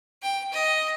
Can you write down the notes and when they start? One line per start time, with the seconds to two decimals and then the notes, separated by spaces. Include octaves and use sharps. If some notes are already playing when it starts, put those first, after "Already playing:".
0.22 G5
0.53 D#5